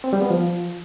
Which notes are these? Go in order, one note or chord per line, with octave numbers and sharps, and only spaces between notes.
C4
G3
B3
F3